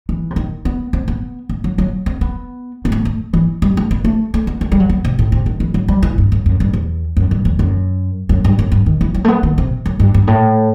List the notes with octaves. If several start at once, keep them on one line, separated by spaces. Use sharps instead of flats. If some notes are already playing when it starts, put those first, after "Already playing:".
E3
C3
D#3
B3
C4
B3
A3
F#3
F#3
C4
B3
B3
A3
A3
E3
G3
A3
B3
A3
A3
B3
A3
G3
F#3
B3
C3
A2
C3
D#3
E3
F#3
G3
E3
G2
F#2
F#2
G2
E2
F#2
G2
E2
F#2
F#2
G2
F#2
G2
D#3
E3
F#3
A3
B3
D#3
C3
F#2
G2
G2
A2